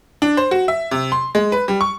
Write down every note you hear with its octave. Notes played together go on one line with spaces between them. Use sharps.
D4
C5
F#4
E5
C3
C6
G#3
B4
G3
C#6